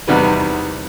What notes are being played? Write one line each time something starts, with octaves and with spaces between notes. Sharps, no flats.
E2 C3 D#3 G3 F#4 B4